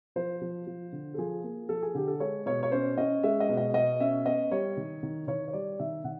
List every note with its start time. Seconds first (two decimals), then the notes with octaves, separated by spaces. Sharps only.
0.16 F3 C5
0.41 F3
0.67 F3
0.92 D3
1.14 A4
1.18 F3 G#4
1.43 A#3
1.69 F3 A4
1.82 G#4
1.95 D3 G4
2.07 A4
2.20 G#3 C#5
2.46 B2 C#5
2.63 C#5
2.72 C#4 C5
2.98 C#4 D#5
3.23 G#3 E5
3.40 D#5
3.49 B2
3.57 D#5
3.74 B2 D#5
4.00 C#4 E5
4.26 B3 D#5
4.51 G3 C#5
4.77 D#3
5.03 D#3
5.28 D#3 C#5
5.48 C#5
5.53 G3 D5
5.79 D#3 E5
6.04 D#3 F#5